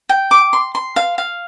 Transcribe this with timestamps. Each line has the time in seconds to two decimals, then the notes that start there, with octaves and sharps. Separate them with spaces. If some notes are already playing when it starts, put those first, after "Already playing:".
0.09 G5
0.31 D6
0.53 C6
0.75 C6
0.96 F5
1.18 F5